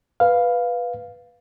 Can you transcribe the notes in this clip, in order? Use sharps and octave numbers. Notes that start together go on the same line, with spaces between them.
B4 F5